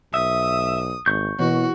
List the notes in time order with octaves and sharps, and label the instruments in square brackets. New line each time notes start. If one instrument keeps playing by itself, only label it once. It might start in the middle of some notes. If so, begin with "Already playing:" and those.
[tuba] B1 [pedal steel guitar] E5 [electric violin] D#6
[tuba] G#1 [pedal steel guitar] C#6 G6
[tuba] B2 [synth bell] E3 E4 [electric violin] F#4